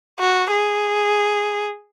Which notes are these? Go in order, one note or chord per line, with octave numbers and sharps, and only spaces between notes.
F#4
G#4